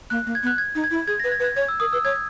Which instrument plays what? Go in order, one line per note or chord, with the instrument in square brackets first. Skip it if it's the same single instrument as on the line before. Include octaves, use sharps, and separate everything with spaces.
[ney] A#3 [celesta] F#6
[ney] A#3
[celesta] G#6
[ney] B3
[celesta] F#6
G#6
[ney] D#4
[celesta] G#6
[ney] E4
[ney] G#4 [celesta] G#6
[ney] B4 [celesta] A#6
[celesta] G#6
[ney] B4
[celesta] G#6
[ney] C#5 [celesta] G#6
[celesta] E6
[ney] A#4 [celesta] D#6
[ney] B4 [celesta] E6
[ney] C#5 [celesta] G#6